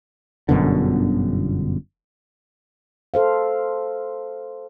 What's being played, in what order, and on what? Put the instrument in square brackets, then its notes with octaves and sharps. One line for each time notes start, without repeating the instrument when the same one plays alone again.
[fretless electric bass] G1 F#2 B2 D3
[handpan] A4 C5 F5